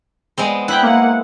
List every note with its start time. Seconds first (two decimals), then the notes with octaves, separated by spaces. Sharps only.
0.38 G#3 B3 C4
0.68 E4 G5 B5 F#6
0.83 A#3 F#5